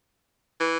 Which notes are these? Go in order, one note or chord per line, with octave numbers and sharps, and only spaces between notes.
E3